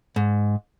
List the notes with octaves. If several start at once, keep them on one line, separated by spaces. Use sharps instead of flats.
G#2